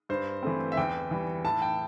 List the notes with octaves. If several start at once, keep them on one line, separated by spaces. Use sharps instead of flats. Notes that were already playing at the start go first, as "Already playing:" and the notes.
G2 C5
E3 A3 C4
E5
E2 G5
E3 G3
A2 A5
G5